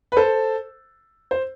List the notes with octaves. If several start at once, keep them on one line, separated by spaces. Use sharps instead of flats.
B4
A4 C5
C5